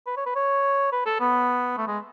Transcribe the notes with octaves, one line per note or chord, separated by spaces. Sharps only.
B4
C#5
B4
C#5
B4
A4
B3
A3
G#3